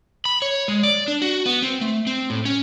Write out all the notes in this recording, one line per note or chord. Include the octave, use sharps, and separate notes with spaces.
B5
C#5
G#3
D5
D4
F#4
B3
C4
A3
C4
A2
C#4